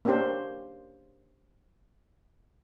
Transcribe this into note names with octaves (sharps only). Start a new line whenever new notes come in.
A#3 C#4 D4 G4 C5